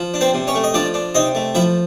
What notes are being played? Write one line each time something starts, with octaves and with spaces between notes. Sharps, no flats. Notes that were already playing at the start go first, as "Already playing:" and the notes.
Already playing: F3
D4
C4 C5
C3
C#4 C#5
A3
D#5
F3 D4 D5
D4
C3 D#4 D#5
A3
F3 E4 E5